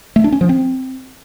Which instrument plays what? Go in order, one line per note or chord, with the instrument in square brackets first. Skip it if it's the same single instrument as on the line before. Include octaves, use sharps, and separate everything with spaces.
[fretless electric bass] A3
D4
C#4
F3
C4